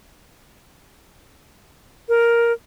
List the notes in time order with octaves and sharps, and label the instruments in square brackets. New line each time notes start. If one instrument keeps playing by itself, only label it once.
[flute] A#4